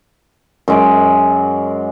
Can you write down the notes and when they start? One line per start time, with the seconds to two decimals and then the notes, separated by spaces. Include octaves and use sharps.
0.68 F#2 G#3 D6